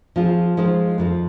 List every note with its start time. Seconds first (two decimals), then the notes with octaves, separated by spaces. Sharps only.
0.16 F3 C4 F4 G#4
0.57 F3 G#3 D#4 C5
0.98 F2 F3 C4